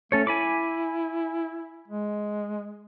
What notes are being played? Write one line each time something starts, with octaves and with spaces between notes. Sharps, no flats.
A3 C#4 A4 C#5
E4 G#5 B5 D6
G#3